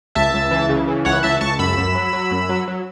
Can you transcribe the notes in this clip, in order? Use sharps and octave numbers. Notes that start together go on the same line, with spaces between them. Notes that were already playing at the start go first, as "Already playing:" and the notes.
C#2 E5 A5
C#2
E3
C#3
E3
C#2 C#5 F#5
C#2 E5 A5
C#2 A5 C#6
F#2 B5 E6
F#2
F#3
F#3
F#2
F#3
F#3